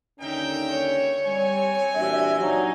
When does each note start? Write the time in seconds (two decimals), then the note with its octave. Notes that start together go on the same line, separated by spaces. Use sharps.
0.20 D#2 D3 C#4 D#4 A#4 E5 G5
0.71 C#5
1.26 G3 C4 G#5
1.95 A#2 E3 D4 F#4 G4 E5
2.40 A#2 F#3 D4 D#4